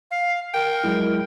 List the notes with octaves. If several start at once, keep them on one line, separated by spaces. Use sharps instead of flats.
F5
A#4 G5
F#3 G#3 E4